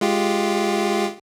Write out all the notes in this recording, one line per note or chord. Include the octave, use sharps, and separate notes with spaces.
G#3 F4 G4